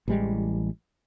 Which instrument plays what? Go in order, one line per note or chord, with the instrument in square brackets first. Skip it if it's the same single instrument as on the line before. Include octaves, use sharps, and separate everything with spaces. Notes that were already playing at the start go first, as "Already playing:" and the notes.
[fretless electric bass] A1 E3 G3 G#3